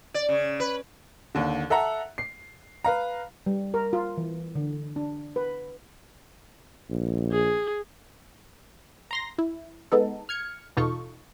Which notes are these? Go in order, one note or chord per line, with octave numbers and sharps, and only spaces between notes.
D5
C#3
B4
D#2 D3
A4 E5 F#5 A#5
C7
B4 F5 A#5
G3
A#4
F4
E3
D3
D4
B4
A#1
G#4
A#5 C6 A#6
E4
G#3 B3 D#4 A4
F6 G#6 C#7
E2 B2 D#4 F4 A4 C#6